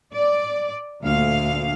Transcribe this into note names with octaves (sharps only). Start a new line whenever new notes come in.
D5
D2 A#2 F5